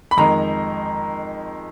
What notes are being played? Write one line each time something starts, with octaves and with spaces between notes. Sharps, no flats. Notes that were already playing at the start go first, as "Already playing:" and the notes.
B5
F2 D#3 G#3 A#5